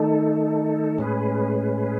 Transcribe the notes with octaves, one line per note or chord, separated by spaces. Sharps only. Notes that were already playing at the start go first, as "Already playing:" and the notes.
Already playing: D#3 A3 D#4 A4
A2 G#3 C#4 G#4 B4